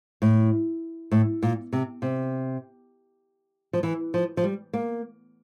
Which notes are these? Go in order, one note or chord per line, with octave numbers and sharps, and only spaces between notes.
A2
A2
A#2
C3
C3
F3
E3
F3
F3
G3
A#3